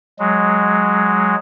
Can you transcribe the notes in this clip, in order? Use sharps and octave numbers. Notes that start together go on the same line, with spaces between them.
F#3 G#3